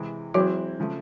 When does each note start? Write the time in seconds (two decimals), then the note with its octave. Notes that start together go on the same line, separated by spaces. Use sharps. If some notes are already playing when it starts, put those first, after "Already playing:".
Already playing: C3 E3 G#3
0.34 E3 F#3 G#3 C4 E4 F#4
0.80 C#3 F3 A3